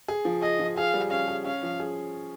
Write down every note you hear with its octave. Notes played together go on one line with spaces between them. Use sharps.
G#4
F3
G#4 D#5
F3
G#4 F5
G3
C#4 F5
G#4
C#4 F5
F3
G#4